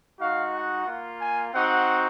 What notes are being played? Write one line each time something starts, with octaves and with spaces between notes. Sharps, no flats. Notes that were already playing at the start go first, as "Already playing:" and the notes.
G#3 D#4 F#4 F5
F#5
A#3 F4
G#5
C4 D#4 F#4 F#5